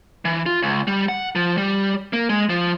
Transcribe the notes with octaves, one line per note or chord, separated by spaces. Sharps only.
E3
F4
C#2
G3
F#5
F3
G3
A#3
G#3
F3